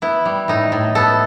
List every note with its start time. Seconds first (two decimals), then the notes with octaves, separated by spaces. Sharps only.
0.02 B3 E4
0.25 G3
0.48 A2 D#4
0.72 A2
0.95 B3 A4